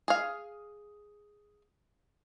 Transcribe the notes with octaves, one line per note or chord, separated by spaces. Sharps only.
G#4 F5